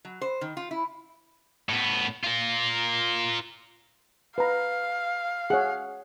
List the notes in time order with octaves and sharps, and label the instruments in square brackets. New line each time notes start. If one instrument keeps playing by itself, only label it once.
[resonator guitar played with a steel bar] F#3
C5
D#3
F4
E4
[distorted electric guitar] A2 B3
F4 A#4
[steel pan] B4 A#5 [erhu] F5
[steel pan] G#4 C#5 [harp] F#5